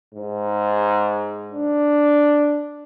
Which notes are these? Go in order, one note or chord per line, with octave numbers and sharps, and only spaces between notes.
G#2
D4